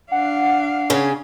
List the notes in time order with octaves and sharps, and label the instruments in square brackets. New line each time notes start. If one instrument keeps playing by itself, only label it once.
[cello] D4 F5 [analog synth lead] F#5
[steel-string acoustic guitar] C#3 C#4